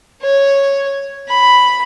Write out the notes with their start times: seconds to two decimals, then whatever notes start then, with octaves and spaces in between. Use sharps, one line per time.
0.22 C#5
1.29 B5